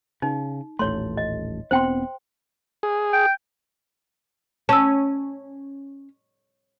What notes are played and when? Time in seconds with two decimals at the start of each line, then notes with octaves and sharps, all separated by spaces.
0.22 C#3 D#4
0.79 D#1 A1 A3 C#5 C6
1.17 D#5
1.71 E1 B3 C4 C5 G5 C6
2.83 G#4
3.13 G5
4.69 C#4 A5 E6